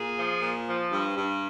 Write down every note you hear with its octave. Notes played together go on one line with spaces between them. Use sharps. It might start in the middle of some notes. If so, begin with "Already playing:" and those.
Already playing: A#2 G#4
F3
A#2
F3
G2
G2